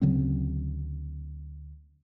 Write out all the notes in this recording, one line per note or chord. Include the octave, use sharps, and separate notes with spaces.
D2 C#3 F#3 C4